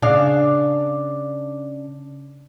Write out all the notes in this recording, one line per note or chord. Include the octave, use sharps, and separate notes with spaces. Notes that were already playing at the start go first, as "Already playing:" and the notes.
C#3 D4 F5